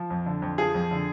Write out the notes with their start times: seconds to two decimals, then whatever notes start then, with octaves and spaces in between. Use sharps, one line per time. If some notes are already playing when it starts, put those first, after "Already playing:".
Already playing: F3
0.10 F2
0.26 D3
0.42 F2
0.58 F3 G#4
0.74 F2
0.91 D3